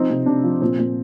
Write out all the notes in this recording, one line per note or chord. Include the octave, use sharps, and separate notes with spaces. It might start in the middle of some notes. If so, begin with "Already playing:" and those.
Already playing: F3 C4 D#4
C3
C3 D4
F3
A#2 C4
A#2